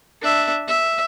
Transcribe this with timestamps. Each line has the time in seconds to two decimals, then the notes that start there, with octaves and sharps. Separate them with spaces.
0.22 D4 E5
0.68 E5